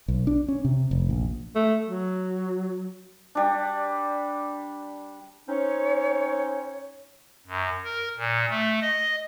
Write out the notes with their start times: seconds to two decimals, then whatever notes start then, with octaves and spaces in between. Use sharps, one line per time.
0.08 B1
0.27 D4
0.48 C#4
0.64 C3
0.91 F1
1.09 A#1
1.55 A3
1.86 F#3
3.35 G3 D4
5.48 C4 C#4 D#4 C#5
7.47 F#2
7.84 A#4
8.17 A#2
8.50 A3
8.81 D#5